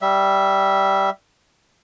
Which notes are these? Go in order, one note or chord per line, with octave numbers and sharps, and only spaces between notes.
G3 E5